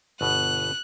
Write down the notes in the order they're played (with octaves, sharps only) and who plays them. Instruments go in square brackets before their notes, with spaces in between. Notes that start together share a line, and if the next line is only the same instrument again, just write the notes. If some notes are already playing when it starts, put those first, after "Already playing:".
[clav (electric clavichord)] G1 B2 [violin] F#6